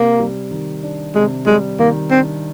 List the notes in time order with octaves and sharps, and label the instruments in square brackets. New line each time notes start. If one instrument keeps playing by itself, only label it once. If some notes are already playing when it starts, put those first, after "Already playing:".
Already playing: [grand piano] C3 [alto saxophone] A#3
[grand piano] G3
D#3
D4
[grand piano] C3 [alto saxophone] G#3
[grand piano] G3 [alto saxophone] G#3
[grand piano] D#3 [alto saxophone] A#3
[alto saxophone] C4 [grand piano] D4